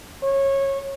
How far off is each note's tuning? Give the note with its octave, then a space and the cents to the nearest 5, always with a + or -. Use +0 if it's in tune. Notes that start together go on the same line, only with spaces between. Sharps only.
C#5 -20